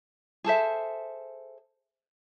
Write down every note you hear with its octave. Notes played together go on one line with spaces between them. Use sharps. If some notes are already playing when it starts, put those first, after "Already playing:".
G#4 A4 C5 E5